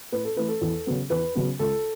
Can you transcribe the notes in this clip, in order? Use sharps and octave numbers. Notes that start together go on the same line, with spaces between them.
A2 B4
A4
E3 A3 B4
A4
E2
C#3 F#3 B3
E2 B4
C#3 F#3 B3
C#2 A4